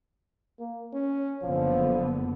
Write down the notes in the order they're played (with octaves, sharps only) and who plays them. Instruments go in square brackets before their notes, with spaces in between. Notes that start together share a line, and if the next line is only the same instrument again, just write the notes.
[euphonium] A#3
C#4
[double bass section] F#1 D3 B3 [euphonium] F3